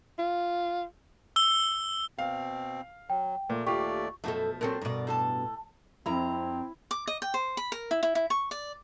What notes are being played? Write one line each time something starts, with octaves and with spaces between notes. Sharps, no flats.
F4
E6 G7
B2 C4 F5
F#3 G5
A#2 A3
D#2 A3 F4 G4 D5 C#6
F#2 B2 F3 A3 A4
A#2 F#3 C4 A4 A#4
G2 B2 A#4 D5
A2 A4 A5
F2 C4 E4 A#5
D6
D#5
G5
C5
B5
A#4
E4
E4
E4
C#6
D5